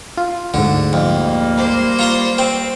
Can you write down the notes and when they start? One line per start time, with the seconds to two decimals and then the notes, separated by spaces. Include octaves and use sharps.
0.17 F4
0.54 D2 G#2 D3
0.93 F2 G3 A#3
1.57 C5
1.99 F4 A#5 C6 C#6
2.38 C4